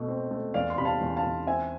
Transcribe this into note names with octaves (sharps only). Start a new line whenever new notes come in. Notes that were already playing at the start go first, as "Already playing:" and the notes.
Already playing: B2 A3
C4
A3
E2 D5 F5
C6
C3 B5
F5 A5
E2
F5 A5
E2
C4 E5 G#5